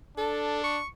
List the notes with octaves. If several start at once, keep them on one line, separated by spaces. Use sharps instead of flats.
D4 A4
C#6